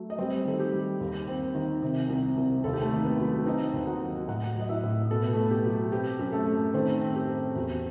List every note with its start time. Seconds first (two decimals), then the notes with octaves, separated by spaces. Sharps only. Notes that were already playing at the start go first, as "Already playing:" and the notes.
Already playing: F#3 A3
0.10 D#5
0.18 G3 C4 C5
0.45 D#3 A4
0.60 G4
0.73 G3
1.01 D#2
1.28 C4
1.54 D#3
1.82 C3
2.09 C2
2.37 C2
2.64 D#2 A4
2.73 G4
2.82 A3 A4
2.92 D#3
3.05 B3 B4
3.19 F#3
3.46 C4 D#4 D#5
3.74 D#2
3.87 F#4 F#5
4.01 F#3
4.28 A2 F#4 F#5
4.55 F#3 D#5
4.69 E4 E5
4.83 A2
5.11 B2 A4
5.22 B4
5.33 A3 A4
5.37 B2
5.51 G4
5.65 F#3
5.92 C4 G4
6.19 F#2
6.32 A3 A4
6.46 A3
6.74 D#3 C4 C5
7.01 C4
7.16 G4
7.29 C4
7.55 E2 F#4